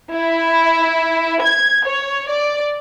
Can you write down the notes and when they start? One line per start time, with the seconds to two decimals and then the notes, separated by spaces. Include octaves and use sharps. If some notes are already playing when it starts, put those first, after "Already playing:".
0.14 E4
1.42 G#6
1.86 C#5
2.30 D5